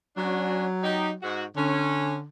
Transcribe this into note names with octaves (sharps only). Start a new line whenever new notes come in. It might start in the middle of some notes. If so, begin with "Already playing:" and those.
F#3 C#4 D4 F#4
D#4 G4
G#2 F#4
D3 C#4